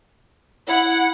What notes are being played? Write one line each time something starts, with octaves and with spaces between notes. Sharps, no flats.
E4 F#5